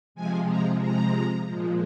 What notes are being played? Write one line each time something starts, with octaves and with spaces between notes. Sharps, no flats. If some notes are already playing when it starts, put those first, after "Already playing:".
C3 F3 G#3 G#5
A#5
A#5
A#2 F3 G#3